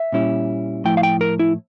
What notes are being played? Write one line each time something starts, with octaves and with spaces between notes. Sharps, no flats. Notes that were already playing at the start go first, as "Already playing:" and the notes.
Already playing: E5
A#2 G3 C#4 E4
A2 F3 A3 E4 G5
F5
G5
A#4
E4